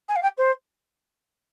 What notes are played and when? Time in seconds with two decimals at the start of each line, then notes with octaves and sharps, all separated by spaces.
0.08 G#5
0.16 F5
0.22 G5
0.37 C5